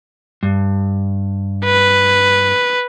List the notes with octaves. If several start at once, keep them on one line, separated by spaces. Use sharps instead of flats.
G2
B4